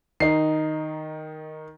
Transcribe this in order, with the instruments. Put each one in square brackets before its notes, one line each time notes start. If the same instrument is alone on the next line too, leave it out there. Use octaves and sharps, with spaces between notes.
[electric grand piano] D#3 [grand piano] D#4 C7